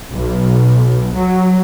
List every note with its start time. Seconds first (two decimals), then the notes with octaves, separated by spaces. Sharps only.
0.12 B1
1.16 F#3